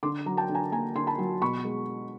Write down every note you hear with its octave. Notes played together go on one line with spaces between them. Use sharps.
D3 C6 D6
F#3 A#5
G5 A5
D3
G#5 A#5
A#3 G#5 A#5
D3 C6
A5 B5
F#3
B2 B5 C#6
G#3